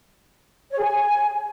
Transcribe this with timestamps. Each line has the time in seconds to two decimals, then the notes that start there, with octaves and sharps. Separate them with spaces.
0.71 C#5
0.77 G#4
0.82 G#5